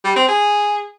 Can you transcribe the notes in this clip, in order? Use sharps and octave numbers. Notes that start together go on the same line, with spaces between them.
G3
C4
G#4